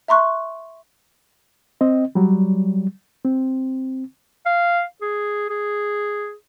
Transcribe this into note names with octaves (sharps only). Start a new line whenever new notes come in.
E5 A#5 C6 C#6 F#6
C4 D#5
F#3 G3
C4
F5
G#4
G#4